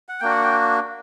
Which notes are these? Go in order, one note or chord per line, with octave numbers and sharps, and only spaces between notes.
F#5
A#3 D4 F#4 G5
F#5
G5